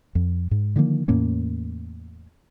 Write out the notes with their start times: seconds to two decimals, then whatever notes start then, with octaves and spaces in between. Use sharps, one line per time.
0.15 F2
0.51 G#2
0.76 D3 D#3 F3 A#3
1.08 E2 A2 A#3 C#4